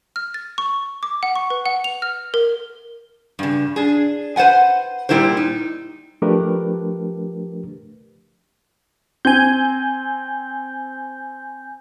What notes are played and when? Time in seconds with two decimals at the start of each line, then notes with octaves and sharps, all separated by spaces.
0.16 F6
0.34 A6
0.58 C#6
1.03 D6
1.23 F#5
1.36 C#6
1.50 B4
1.66 F#5
1.84 F7
2.02 F6
2.34 A#4
3.39 G2 C#3
3.76 D4 G#4
4.36 B4 C5 D5 F#5 G#5
5.09 A#2 D#3 G3 E4 A#4 C5
5.37 D#4
6.22 F3 A3 D4 G4 A#4 B4
9.25 C4 G#5 G6